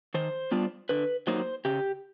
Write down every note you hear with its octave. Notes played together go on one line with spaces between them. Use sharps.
D#3 C5
G3 B3 D4 F4
D3 B4
F#3 A#3 D#4 C5
C#3 G4